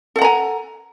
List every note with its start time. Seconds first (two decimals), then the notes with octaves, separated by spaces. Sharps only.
0.16 A4
0.19 F#5
0.22 A#5
0.24 G#5